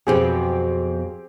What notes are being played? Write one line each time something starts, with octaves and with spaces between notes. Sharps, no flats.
F2 B2 F#3 C4 G4 G#4